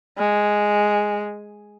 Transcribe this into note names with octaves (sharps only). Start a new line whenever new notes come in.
G#3